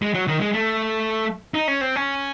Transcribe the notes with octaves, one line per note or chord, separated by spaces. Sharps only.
G#3
F#3
D#3
G#3
A3
D#4
C#4
C4
C#4